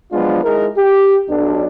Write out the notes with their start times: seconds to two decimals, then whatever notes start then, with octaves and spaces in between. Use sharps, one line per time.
0.12 F3 F#3 G#3 B3 D4 F4
0.44 G#3 D#4 E4 G#4 A#4
0.77 G4
1.30 B1 D4